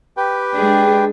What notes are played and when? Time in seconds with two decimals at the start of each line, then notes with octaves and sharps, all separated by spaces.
0.17 G4 B4 G5
0.55 G#3 D4 G#4